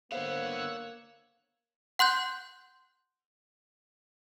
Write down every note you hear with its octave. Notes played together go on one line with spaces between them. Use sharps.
D3 A#3 B3 C5 C#5 F5 E6 F#6
F#5 C6 F#6 G6